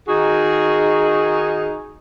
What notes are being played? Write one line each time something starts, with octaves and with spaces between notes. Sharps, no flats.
D#3 D#4 F#4 G#4